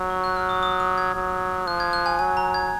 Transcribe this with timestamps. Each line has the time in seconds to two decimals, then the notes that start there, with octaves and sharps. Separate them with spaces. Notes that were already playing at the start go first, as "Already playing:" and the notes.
Already playing: F#3
0.10 C#6
0.24 F#6
0.37 F6
0.49 D#6
0.63 D#6
0.80 D#6
0.98 G#6
1.15 F#3
1.67 F3 F#6
1.80 G#6
1.93 F#6
2.06 G#5
2.19 F#3 G#5
2.37 A#5
2.54 G#6